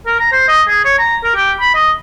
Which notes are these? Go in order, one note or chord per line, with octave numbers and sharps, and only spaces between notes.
A#4
A#5
C5
D#5
G#4
C#5
A#5
A#4
G4
B5
D#5